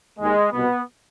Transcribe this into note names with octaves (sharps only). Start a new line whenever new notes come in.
D#2 D#3 G#3
C2 B2 B3